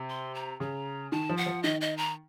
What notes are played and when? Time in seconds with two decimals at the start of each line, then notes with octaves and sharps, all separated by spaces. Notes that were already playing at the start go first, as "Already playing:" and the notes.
Already playing: C3
0.10 C6
0.35 A#5
0.60 C#3 A#5
1.12 D#3 A5
1.29 F3
1.37 F#5
1.46 F3
1.63 D#3 D#5
1.81 D#5
1.98 A#5